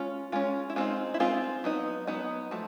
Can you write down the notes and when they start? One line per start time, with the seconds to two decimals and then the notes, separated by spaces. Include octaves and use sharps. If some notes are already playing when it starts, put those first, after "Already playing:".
Already playing: G#3 C#4 F4
0.32 G#3 C#4 F4
0.70 E4
0.76 G#3 C4 D#4 F4
1.14 E4
1.20 G#3 C4 D#4 F4
1.64 F#3 B3 D#4
2.07 F#3 B3 D#4
2.51 F3 A3 F#4